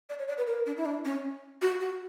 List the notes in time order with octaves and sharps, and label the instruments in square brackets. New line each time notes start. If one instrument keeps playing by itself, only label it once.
[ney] D5
C#5
D5
B4
A#4
D4
E4
D4
C#4
F#4
F#4